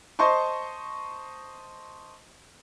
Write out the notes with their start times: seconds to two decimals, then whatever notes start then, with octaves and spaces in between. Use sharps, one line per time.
0.19 C5 D#5 A5 C6 C#6